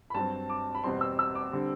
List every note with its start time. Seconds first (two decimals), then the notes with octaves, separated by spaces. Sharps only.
0.10 B5
0.14 G2 F#3 C4 A5
0.50 D6
0.75 B5
0.84 E2 B2 G3 C4 C6
1.01 E6
1.19 E6
1.35 D6
1.52 D3 G3 C4